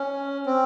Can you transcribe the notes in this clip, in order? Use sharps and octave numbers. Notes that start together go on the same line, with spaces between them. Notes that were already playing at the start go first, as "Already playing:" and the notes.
Already playing: C#4
C4